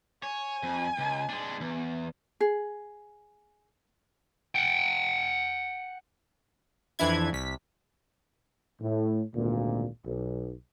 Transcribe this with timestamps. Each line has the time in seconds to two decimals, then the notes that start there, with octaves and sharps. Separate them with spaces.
0.23 C#5 G#5
0.63 F2
0.98 C#2
1.30 G#3 D4
1.61 E2
2.41 G#4
4.55 F#5 G5
6.99 F2 E3 D4 E4 G#6
7.33 C2 B6
8.80 A2
9.35 G#1 D2 A#2
10.05 B1